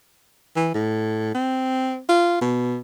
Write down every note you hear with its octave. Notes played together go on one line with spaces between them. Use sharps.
E3
A2
C4
F4
B2